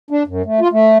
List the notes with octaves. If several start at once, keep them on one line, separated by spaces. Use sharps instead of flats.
D4
F#2
A3
F4
A3